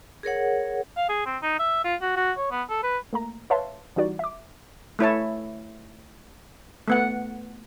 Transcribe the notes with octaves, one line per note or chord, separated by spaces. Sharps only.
G#4 A#4 C#5 F#5
F5
G#4
C4
D#4
E5
F4
F#4
F#4
C#5
B3
A4
B4
A3 A#3 A#5
B4 C#5 E5 F5 A5 C6
E3 G3 D#4 F#4 D5
E5 D6
A3 E4 C#5 A5
A3 B3 F#5